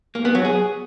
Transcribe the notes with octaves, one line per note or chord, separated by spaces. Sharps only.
A#3
B3
F#3
G#4